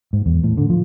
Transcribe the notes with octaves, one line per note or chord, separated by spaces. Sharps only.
G#2
E2
A2
D3
F3